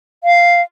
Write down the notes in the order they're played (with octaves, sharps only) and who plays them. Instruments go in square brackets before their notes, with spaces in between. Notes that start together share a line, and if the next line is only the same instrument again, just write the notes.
[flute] F5